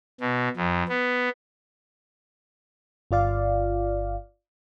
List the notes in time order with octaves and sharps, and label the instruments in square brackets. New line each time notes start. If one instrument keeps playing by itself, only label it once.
[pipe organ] B2
F2
B3
[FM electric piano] G1 F4 D5 F5